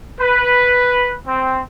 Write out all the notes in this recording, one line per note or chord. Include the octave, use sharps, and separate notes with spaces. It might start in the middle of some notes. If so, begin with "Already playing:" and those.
B4
C4